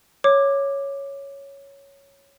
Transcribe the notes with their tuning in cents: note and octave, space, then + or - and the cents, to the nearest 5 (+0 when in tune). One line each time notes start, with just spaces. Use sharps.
C#5 +0 D6 +10